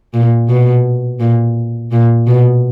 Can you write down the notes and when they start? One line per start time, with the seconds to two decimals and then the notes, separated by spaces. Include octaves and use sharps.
0.14 A#2
0.49 B2
1.20 A#2
1.92 A#2
2.27 B2